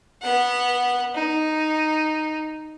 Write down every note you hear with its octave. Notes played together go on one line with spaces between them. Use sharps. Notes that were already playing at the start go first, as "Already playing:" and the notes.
B3 F#5
D#4